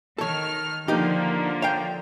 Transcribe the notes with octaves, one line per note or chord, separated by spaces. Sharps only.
D#3 A4 C#5 F6
D3 F3 A#3 D#4 G4
C#5 F5 G5